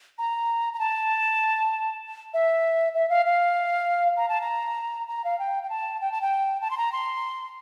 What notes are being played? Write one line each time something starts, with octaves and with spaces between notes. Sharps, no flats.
A#5
A#5
A5
E5
E5
F5
F5
A#5
A5
A#5
A#5
F5
G5
G5
A5
G5
A5
G5
A5
C6
A#5
C6